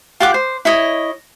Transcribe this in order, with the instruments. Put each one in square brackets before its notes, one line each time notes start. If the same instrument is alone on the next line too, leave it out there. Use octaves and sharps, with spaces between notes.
[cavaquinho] F4 G4 F#5 D6
C5
E4 C#5 D#5